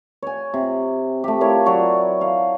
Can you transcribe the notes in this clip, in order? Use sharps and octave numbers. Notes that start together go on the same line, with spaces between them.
C#5 G#5
C3
A3 G4
E4 A#4 C#5 F5
F#3 C#5 D5 C#6
F5